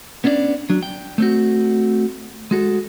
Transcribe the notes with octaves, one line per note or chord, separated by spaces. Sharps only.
B3 C#4 D4 E4 D5
F#3 D4
G5
A3 C4 F#4
G#3 F#4 A4